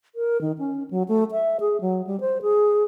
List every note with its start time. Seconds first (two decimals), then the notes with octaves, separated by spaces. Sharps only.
0.15 A#4
0.41 D#3
0.58 C#4
0.91 F#3
1.08 A3
1.32 E5
1.60 G#4
1.81 F#3
2.07 G3
2.20 C5
2.42 G#4